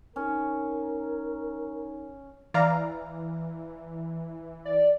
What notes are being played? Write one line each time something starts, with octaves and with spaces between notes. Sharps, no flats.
C#4 D#4 A#4
E3 D5 F5 A#5
D5